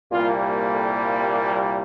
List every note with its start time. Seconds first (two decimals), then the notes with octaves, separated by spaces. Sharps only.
0.11 C2 A#2 G3 A#3 F4
0.73 A4
1.34 G4